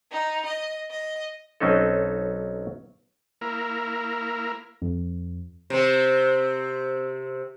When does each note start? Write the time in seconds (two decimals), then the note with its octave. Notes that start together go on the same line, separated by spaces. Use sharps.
0.12 D#4
0.46 D#5
0.91 D#5
1.60 B1 F#3 C4 C#4 D#4 A4
3.41 A#3 E4 A#4
4.82 F2
5.70 C3 C4